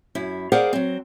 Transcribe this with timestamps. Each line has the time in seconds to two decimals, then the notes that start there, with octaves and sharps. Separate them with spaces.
0.15 F#2 E4
0.52 G#4 A#4 C5 D5 F5 F#5
0.73 F#3 C4